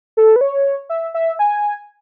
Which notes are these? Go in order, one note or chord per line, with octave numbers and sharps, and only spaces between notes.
A4
B4
C#5
E5
E5
G#5